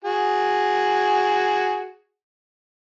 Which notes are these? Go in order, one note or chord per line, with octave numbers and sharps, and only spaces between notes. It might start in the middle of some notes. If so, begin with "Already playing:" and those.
F#4 G#4